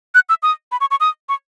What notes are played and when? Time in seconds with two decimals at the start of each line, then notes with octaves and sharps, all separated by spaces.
0.15 F#6
0.29 E6
0.43 D#6
0.72 B5
0.81 C#6
0.91 C#6
1.00 D#6
1.29 C#6